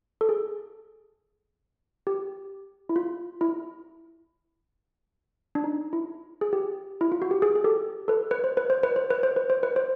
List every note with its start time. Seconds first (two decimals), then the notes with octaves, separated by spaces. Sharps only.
0.21 A4
0.29 G#4
2.07 G4
2.89 E4
2.96 F4
3.41 E4
5.55 D4
5.64 D#4
5.93 E4
6.41 G#4
6.53 G4
7.01 E4
7.12 F4
7.22 F#4
7.31 G4
7.42 G#4
7.55 G#4
7.64 G4 A4
8.08 A4 B4
8.31 B4
8.44 C5
8.57 B4
8.70 C5
8.83 B4
8.96 C5
9.10 B4
9.23 C5
9.36 B4
9.50 C5
9.63 B4
9.76 C5